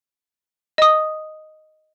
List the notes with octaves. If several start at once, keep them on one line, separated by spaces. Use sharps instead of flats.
D#5 D#6